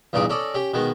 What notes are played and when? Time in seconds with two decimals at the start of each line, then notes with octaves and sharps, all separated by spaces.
0.13 E2 G2 A#2 D#4 G#4 D6
0.30 C#4 A4 D5 D#5
0.54 C#4 G4
0.74 B2 D#3 G#3 B3